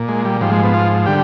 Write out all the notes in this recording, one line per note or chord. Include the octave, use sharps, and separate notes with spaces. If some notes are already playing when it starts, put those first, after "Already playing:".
Already playing: A#2
G#3
G3
G#2 F3 G3
G#3
B3
F4
D3 G3 G4